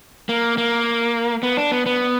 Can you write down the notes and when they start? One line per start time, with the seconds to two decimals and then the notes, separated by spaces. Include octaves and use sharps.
0.29 A#3
0.58 A#3
1.43 B3
1.57 D4
1.71 B3
1.86 B3